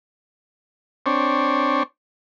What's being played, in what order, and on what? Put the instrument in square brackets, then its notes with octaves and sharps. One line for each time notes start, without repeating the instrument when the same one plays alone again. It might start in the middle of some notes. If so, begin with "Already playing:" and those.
[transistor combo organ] C4 D4 C#5